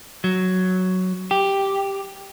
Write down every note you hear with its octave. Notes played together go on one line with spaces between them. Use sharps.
F#3
G4